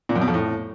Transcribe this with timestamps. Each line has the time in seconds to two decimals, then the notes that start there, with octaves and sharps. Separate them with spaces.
0.09 A#2
0.15 F#2
0.22 B2
0.28 F2
0.34 A2